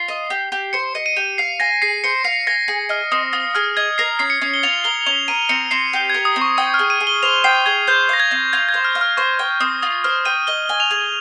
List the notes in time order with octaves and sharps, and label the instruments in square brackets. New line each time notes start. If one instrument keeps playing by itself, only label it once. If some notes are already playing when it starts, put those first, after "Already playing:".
Already playing: [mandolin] F4 [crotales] C7
[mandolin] D#5
G4
G4
[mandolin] C5 [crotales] C#7
[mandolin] D#5
[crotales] D#7
[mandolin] G4
[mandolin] F5 [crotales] C7
[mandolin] G#5 [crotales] A#6
[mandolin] G#4 [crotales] C7
[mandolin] C5 [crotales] C#7
[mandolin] F5 [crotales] C7
[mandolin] G#5 [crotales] A#6
[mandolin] G#4
[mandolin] D#5 [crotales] F6
[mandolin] C4 [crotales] D#6
[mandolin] F4 [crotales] D#6
[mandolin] G#4 [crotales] F6
[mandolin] D#5 [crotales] G#6
[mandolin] A#4 [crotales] C7
[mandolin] C#4 [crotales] C7
[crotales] C#7
[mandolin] C#4
[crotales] G7
[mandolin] F4 [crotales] F7
[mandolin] A#4 [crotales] G7
[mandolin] C#4 [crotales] F7
[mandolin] A#4 [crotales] D#7
[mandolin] C4 [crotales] C#7
[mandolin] C4 [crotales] C7
[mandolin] G4
[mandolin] A#4 [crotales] G#6
[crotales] D#6
[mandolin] C4
[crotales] C#6
[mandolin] G5 [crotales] D#6
[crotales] F6
[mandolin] G#4
[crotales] D#7
[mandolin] G#4
[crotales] G7
[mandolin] C5 [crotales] F7
[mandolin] G5 [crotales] C7
[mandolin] G#4 [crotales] G#6
[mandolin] C5 [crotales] G6
[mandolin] F5 [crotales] A#6
[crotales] G#6
[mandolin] C4
[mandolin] F4 [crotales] G#6
[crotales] G#6
[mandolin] C5
[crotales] F6
[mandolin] F5
[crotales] F6
[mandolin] C5 [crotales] C#6
[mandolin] G5
[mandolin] C4 [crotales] D#6
[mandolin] F4 [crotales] D#6
[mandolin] C5 [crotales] F6
[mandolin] G5 [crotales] D#7
[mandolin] D#5 [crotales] G7
[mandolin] G#5
[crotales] F7
[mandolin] G#4